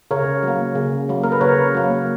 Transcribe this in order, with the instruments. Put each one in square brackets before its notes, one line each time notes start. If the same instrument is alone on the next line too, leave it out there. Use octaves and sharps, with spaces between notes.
[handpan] C#3 A#4 C#5
F#3 A#3
C#3
F#3 A#3
A#4
B4
C#3 A#4 C#5
F#3 A#3